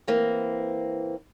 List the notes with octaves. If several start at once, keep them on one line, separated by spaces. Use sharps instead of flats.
E3 A#3 C4